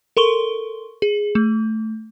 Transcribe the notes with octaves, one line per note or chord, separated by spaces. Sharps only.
A4 A#4 C6 C#6 G7
G#4
A3